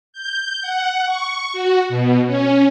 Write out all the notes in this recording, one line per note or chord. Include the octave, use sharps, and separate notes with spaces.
G6
F#5
C#6
F#4
B2
C#4